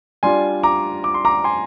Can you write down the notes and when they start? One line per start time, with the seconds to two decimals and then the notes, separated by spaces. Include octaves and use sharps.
0.23 G3 D4 F4 G#5 C6
0.63 A#5 D6
1.04 D6
1.14 C6
1.25 A#5 D6
1.44 G#5 C6